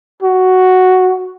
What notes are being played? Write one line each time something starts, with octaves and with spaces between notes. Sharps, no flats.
F#4